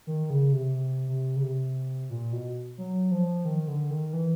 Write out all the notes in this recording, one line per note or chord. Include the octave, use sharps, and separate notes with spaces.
D#3
C#3
C3
C3
C3
C#3
C3
A#2
B2
F#3
F3
D#3
D3
D#3
E3